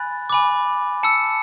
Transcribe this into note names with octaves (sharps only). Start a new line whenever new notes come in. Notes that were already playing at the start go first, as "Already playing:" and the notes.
Already playing: G#5 B5 F#6 A6
G#5 B5 D6
A5 E6 C#7